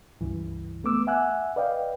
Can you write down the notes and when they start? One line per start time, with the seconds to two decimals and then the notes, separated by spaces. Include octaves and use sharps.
0.21 C#2 G2 E3
0.84 A3 B3 D6 E6
1.07 E5 F#5 G#5 E6 F#6
1.56 B4 D5 D#5 F5 G5